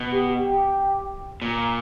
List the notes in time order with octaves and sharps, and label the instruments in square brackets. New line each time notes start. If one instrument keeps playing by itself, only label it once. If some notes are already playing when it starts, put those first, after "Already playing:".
Already playing: [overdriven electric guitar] B2
[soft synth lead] G4
G4
[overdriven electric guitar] A#2